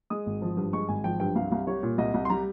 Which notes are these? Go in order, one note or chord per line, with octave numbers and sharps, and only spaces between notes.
G#3 D#6
G#1
F3
G2
G#3 C#6
G#1 G#5
F3 G5
G2 G5
C2 F5
C2 F5
G3 C#5
A#2
C2 D#5
C2
C6
G3 A#5